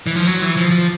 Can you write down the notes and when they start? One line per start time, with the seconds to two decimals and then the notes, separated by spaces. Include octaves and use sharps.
0.07 E3
0.16 F3
0.27 F#3
0.42 E3
0.57 F3
0.71 F3